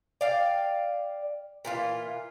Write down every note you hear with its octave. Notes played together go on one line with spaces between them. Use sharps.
D5 F5 G5
A#2 E3 F4